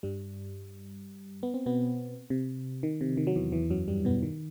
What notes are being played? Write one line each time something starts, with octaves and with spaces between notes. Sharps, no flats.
G2 G3
B3
C4
B2 B3
C3
D#3
C3
D#3
F#3
E2 E3
E2 E3
F#2 F#3
G2 G3
B2 B3
D#3